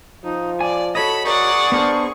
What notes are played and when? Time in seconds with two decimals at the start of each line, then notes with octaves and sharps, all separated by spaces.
0.24 F3 D#4
0.61 D5 G#5
0.95 F#4 A4 C#5 D#5 B5
1.25 G#4 A#4 D5 F#5 C#6
1.72 B3 D4 A#4 C5